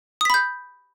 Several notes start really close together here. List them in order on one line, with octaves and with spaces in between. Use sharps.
D#6 B6 B5 G6